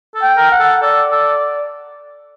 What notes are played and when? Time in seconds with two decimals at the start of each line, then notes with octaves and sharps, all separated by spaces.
0.15 A4
0.22 G5
0.37 A#4
0.51 F#5
0.60 A4
0.82 A4 D5
1.12 A4